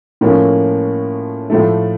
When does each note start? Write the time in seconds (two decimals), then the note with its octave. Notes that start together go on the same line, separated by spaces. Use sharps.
0.21 A2 F3 A#3 C#4
1.50 A2 F3 A3